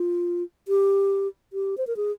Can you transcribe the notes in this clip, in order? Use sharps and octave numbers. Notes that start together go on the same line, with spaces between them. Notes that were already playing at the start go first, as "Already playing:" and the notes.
Already playing: F4
G4
G4
C5
A#4
G#4